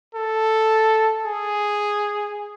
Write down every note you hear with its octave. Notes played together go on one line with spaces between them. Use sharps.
A4
G#4